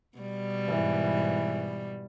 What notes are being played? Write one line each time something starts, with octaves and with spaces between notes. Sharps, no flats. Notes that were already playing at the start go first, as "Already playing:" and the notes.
B2 G3
G#2 E3